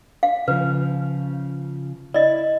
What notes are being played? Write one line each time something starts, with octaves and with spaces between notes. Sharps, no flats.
F5
C#3 F3 B4
E4 D5 D#5